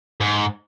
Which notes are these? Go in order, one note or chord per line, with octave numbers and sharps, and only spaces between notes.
G#2